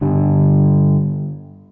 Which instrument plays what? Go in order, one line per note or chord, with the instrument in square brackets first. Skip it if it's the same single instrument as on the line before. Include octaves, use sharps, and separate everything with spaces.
[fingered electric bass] G2 D3 G3